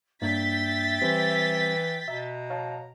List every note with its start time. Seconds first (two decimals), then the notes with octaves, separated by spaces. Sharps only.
0.22 G2 A#3 D4 E5 G5 G6 A6 B6
1.01 E3 G3 C4
2.08 B2 E5 A#5
2.50 C#5 F5 A5